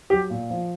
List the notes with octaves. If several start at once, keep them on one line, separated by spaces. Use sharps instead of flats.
F#3 G4
A#2
F3